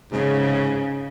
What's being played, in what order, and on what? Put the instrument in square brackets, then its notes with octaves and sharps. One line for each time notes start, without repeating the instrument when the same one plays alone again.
[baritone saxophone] G#2 [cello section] C#3